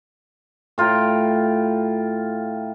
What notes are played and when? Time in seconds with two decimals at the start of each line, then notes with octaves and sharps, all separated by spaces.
0.78 A2 F4 G5 A#5